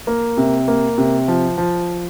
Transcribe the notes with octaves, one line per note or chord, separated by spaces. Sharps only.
A#3
C3
A#3
C3
F3
F3